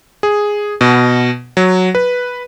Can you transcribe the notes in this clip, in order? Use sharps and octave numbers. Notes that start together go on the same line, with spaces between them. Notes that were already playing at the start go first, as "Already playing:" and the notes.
G#4
B2
F#3
B4